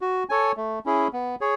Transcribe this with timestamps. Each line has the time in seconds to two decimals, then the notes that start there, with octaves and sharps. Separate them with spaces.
0.01 F#4
0.29 A4 C#5 G#5
0.57 A3
0.86 C#4 E4 G#4
1.13 B3
1.41 G#4 C#5